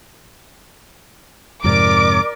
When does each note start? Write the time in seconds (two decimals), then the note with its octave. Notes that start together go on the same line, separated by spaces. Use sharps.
1.64 F2 G#2 C3 A#4 D5 D6